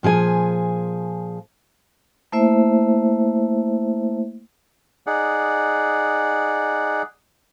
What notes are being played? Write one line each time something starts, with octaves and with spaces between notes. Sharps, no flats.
A#2 F3 G#4 G#5
A3 A#3 E4 C5 E5
D#4 G#4 D5 F#5